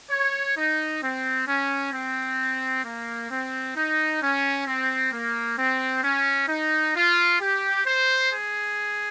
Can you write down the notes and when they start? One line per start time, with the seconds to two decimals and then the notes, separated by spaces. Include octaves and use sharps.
0.10 C#5
0.57 D#4
1.02 C4
1.47 C#4
1.93 C4
2.84 A#3
3.30 C4
3.75 D#4
4.21 C#4
4.67 C4
5.12 A#3
5.58 C4
6.03 C#4
6.48 D#4
6.95 F4
7.40 G4
7.85 C5
8.31 G#4